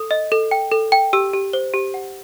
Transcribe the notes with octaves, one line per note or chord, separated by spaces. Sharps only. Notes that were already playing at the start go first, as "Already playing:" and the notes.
Already playing: A4 D#6
D#5
A4
G5
A4
G5
G4 E6
G4
C5
G4
F#5